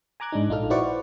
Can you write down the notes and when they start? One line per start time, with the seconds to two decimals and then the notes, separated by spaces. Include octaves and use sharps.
0.20 G#5 A#5 D6 F#6 G#6
0.32 G#2 D4 D#4
0.49 A#1 D#4 F4 A4 F6
0.70 E4 F#4 B4 C5 D5 C#6